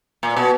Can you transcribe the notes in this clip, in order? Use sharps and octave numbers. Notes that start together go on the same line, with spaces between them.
A#2
B2